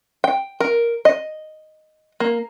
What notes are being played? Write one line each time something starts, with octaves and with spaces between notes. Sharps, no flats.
G5
A#4
D#5
A#3